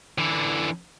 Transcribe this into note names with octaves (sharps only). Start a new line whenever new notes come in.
D3 E3